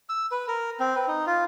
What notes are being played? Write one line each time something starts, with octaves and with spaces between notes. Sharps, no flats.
E6
B4
A#4
C4
B4
D#4
F4